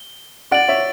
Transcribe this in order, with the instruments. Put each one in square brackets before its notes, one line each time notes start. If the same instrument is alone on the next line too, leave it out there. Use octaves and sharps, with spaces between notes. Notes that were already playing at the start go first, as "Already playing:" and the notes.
Already playing: [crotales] G7
[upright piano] D5 F#5 [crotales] A6 D7 F#7
[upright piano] C#5 E5